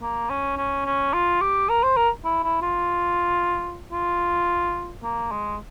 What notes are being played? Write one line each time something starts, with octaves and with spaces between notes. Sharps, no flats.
A#3
C#4
C#4
C#4
F4
G4
A#4
C5
A#4
E4
E4
F4
F4
A#3
G#3